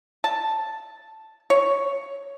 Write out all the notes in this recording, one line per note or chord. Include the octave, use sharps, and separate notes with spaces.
A5
C#5